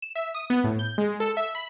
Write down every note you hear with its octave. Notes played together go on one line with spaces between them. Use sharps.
E7
E5
D#6
B3
A2
G6
G#3
A4
E5
B5